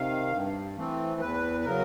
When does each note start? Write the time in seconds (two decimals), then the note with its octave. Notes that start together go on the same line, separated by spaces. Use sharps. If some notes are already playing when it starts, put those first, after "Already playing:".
Already playing: C3 D#3 F5
0.32 G2
0.77 E3 A3 C4
1.21 E2 B4
1.60 B4
1.65 C#3 F#3 A#4